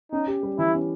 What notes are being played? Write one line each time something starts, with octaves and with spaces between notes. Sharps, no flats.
C#4 D#4
G4
G3
E3 E4
C#4